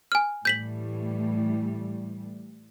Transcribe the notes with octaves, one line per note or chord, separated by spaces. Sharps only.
G#5 F6
A2 E3 G3 G6 B6 F#7